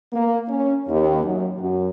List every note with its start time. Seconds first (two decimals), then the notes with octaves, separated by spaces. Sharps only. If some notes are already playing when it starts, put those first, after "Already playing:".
0.13 A#3
0.48 C#4
0.89 D#2
1.23 F#2
1.59 F#2